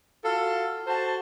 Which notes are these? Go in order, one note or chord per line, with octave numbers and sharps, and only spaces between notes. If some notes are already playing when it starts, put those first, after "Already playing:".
F4 F#4 A4
F#4 A4 C5 A5